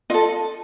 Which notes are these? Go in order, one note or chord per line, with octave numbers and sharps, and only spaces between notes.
F4 A4 D#5